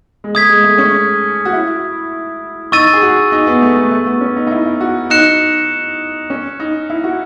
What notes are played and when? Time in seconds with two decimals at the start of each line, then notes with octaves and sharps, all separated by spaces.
0.24 G#3
0.34 A3 D#6 G#6 B6
0.49 G#3
0.64 A3
0.78 C#4
1.45 F#4
1.53 E4
2.72 D#4 C#6 E6 A6 D#7
2.93 G#4
3.02 F#4
3.32 D#4
3.47 B3
3.62 A3
3.76 A3
3.91 A3
4.06 B3
4.21 C#4
4.36 D#4
4.47 D#4
4.51 E4
4.66 E4
4.81 F#4
5.10 D#4 F#6 C#7 E7
6.30 C#4
6.60 D#4
6.90 E4
7.04 F#4